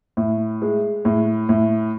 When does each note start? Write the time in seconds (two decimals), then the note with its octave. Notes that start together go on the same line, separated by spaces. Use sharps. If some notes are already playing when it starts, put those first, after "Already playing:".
0.17 A2
0.62 G#3
1.05 A2
1.49 A2